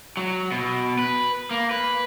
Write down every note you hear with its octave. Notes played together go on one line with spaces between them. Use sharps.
F#3
B2
B4
A#3
B4